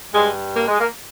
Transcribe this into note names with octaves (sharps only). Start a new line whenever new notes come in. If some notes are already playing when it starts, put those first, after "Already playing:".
G2 G3 G#3
A#3
G#3
A#3